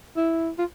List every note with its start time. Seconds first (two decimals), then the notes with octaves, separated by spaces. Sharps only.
0.17 E4
0.59 F4